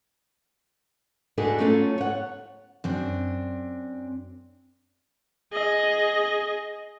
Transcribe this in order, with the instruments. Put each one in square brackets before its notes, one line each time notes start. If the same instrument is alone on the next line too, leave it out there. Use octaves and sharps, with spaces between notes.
[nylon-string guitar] D4 D#4 F#4 G#4 A4 B4
F#3 A3 C#4 F4 A4
C#5 F#5
[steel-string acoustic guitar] F#2 C4 D4
[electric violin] G#4 D#5